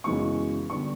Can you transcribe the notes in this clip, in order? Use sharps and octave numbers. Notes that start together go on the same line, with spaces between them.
F#2 C#3 E3 G#3 B3 C#6
D3 G3 B3 C#6